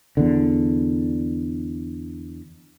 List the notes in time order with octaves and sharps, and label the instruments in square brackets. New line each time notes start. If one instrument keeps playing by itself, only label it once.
[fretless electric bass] E2 D3